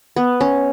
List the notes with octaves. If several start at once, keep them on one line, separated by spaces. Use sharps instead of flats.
B3
C#4